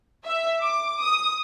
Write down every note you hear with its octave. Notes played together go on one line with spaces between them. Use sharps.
E5
D6
D#6